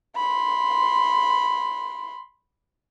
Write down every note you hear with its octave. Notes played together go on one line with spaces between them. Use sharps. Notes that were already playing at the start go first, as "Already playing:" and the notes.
B5 C6